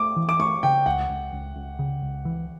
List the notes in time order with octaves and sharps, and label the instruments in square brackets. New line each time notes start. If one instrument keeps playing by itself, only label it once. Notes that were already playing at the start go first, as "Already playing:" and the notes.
Already playing: [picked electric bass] A3 [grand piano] D6
[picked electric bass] E3
[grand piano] D6
[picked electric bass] A3 [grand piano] C#6
[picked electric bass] C#3 [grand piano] G5
[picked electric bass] C#2 [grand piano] F#5
[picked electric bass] C#2
C#2
C#2
C#3
C#2
E3